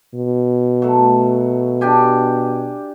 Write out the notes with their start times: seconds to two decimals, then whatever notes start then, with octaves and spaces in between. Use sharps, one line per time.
0.15 B2
0.82 F#3 A3
1.81 D4 G4 G#5